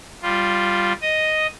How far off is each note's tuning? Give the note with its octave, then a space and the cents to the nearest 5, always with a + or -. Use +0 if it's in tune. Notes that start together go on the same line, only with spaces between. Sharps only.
G3 +0 F4 +0
D#5 +0 D#6 +0